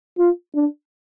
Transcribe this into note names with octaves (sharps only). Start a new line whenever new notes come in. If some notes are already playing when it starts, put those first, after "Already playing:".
F4
D4